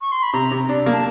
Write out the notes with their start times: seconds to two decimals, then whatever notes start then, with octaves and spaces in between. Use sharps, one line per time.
0.01 C#6
0.12 C6
0.23 B5
0.33 C3 A#5
0.51 C3
0.69 D4
0.86 A#3
0.93 A5